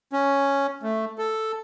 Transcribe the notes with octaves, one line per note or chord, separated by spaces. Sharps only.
C#4
A3
A4